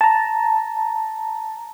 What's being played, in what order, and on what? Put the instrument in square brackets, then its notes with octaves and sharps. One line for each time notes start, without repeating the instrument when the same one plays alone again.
[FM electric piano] A5 A#5